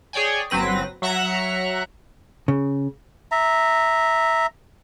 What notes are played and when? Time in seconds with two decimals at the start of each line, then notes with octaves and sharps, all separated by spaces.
0.13 G#4 C#5 D5 G5 G#5
0.50 G1 F#3 C4 B4 A#6
1.02 F#3 E5 F#5 A#5 F#6
2.48 C#3
3.32 E5 A#5